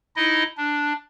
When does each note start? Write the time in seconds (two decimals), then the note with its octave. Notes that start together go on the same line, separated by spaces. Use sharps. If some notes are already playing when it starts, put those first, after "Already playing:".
0.16 D#4 E4 D#5
0.58 D4